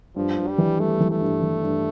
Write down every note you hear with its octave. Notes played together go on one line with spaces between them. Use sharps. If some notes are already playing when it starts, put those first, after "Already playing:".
G2 F3
G2
G3
E3
G3 A3
E3
A3
G2
E3
G2